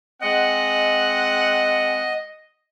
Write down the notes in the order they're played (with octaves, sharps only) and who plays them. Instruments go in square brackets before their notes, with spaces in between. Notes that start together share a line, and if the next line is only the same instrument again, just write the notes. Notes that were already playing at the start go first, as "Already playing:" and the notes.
[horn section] G#3 C4 F#5 [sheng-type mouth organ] D#5